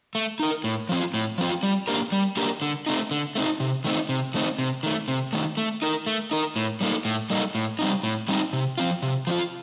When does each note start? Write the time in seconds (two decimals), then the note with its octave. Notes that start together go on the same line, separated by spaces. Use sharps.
0.15 A3
0.40 D#4 A#4
0.64 A2
0.89 F3 C4 F4
1.14 A2
1.38 F3 C4 F4
1.63 G3
1.88 A#3 D4 G4 A#4
2.12 G3
2.37 A#3 D4 G4 A#4
2.62 D3
2.86 A3 C4 D#4
3.11 D3
3.35 A3 C4 D#4
3.60 C3
3.84 D#3 A3 C4 D#4
4.09 C3
4.34 D#3 A3 C4 D#4
4.59 C3
4.83 D#3 A3
5.08 C3
5.33 D#3 A3
5.57 A3
5.82 D#4 A#4
6.07 A3
6.31 D#4 A#4
6.56 A2
6.81 G3 A#3 D#4 A4
7.05 A2
7.30 G3 A#3 D#4 A4
7.55 A2
7.79 G3 C4 D#4
8.03 A2
8.28 G3 C4 D#4
8.53 C3
8.78 F3 C4 F4
9.02 C3
9.27 F3 C4 F4